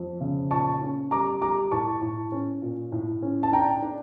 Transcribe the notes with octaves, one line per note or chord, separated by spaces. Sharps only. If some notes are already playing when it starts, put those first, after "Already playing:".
Already playing: F2
C#3
A#2 A5 C#6
C#4
G3 A#5 D6
G3 A#5 D6
A2 A5 C#6
A2
C#4
A#2
A2
C#4
A5
D4 G5 A#5
D4